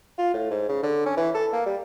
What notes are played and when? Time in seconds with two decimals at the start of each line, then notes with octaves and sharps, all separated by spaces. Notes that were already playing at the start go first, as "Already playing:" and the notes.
0.18 F4
0.34 A2
0.51 G#2
0.69 C#3
0.83 D3
1.06 C#4
1.17 E3
1.34 A4
1.53 A#3
1.66 G3